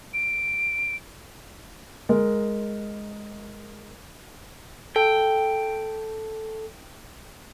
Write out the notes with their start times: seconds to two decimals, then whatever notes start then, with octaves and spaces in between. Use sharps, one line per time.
0.14 D7
2.09 G#3 A#4
4.96 A4 G5